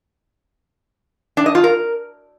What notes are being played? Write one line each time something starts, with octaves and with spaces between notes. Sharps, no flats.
D4
D#5
F4
A#4